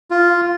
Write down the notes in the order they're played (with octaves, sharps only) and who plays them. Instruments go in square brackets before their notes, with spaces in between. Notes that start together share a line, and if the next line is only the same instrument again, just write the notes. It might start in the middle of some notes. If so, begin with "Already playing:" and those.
[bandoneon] F4